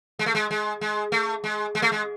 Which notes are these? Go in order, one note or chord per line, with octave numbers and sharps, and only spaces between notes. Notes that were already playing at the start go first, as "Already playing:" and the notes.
G#3
A3
G#3
G#3
G#3
A3
G#3
G#3
A3
G#3